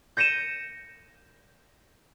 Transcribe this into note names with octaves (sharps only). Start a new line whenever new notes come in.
G6 A#6 C#7 D#7 E7